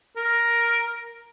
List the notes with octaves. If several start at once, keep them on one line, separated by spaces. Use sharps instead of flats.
A#4